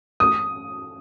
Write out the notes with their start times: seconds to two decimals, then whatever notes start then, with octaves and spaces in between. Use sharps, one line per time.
0.20 D#6